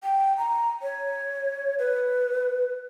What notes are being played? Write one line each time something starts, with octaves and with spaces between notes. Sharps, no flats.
G5
A#5
C#5
B4